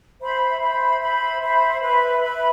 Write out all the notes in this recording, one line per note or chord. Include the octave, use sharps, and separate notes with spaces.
C5 E5 B5
C5 E5 B5
C5 E5 B5
C5 E5 B5
B4 E5 B5
B4 E5 B5